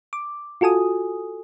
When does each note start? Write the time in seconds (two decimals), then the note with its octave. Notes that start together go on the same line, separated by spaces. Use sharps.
0.13 D6
0.61 F4 F#4 A4 G#5 D#6